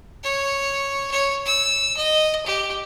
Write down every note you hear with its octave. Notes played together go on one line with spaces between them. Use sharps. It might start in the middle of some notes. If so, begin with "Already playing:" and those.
C#5
C#5
E6
D#5
G4